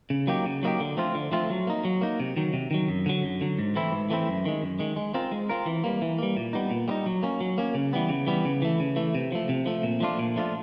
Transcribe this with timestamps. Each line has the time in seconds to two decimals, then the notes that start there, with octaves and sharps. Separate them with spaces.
0.10 C#3
0.27 F#3 A#3 D#4 G4
0.46 C#3
0.63 F#3 A#3 D#4 G4
0.80 D3
0.97 F3 A3 C4 F4
1.15 D3
1.32 F3 A3 C4 F4
1.50 F#3
1.67 A#3 D#4
1.85 F#3
2.01 A#3 D#4
2.20 C3
2.36 D#3 F#3
2.53 C3
2.71 D#3 F#3
2.88 F#2
3.06 D3 F#3
3.23 F#2
3.41 D3 F#3
3.59 G#2
3.75 E3 A3 C4 E4
3.92 G#2
4.10 E3 A3 C4 E4
4.27 F#2
4.45 D#3 G#3
4.62 F#2
4.79 D#3 G#3
4.96 G#3
5.14 C4 F4 A#4
5.32 G#3
5.50 C4 F4 A#4
5.66 E3
5.84 G3 A#3
6.02 E3
6.18 G3 A#3
6.37 A#2
6.53 G3 B3 D#4
6.71 A#2
6.88 G3 B3 D#4
7.06 F#3
7.23 A#3 C#4
7.41 F#3
7.58 A#3 C#4
7.74 C#3
7.93 E3 G3 B3
8.09 C#3
8.27 E3 G3 B3
8.45 C#3
8.62 E3 A3
8.80 C#3
8.96 E3 A3
9.15 C3
9.32 F3 A3
9.49 C3
9.66 F3 A3
9.83 A#2
10.00 F3 A3 D4 F4
10.19 A#2
10.36 F3 A3 D4 F4